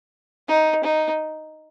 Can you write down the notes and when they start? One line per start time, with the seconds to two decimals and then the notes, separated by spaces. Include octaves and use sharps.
0.48 D#4
0.84 D#4